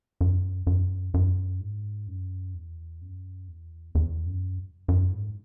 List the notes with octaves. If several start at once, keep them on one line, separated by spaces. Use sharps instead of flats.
F#2
F#2
F#2
G#2
F#2
E2
F#2
E2
E2
F#2
F#2
G#2